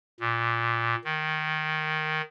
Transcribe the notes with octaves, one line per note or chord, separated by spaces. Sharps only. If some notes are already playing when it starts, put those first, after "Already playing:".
A#2
D#3